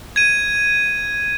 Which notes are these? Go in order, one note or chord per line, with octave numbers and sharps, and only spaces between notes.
G#6 D#7